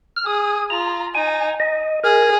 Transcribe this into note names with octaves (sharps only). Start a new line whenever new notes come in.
F6
G#4 D#6
F4 A#5
D#4 G#5
D#5
G#4 A#4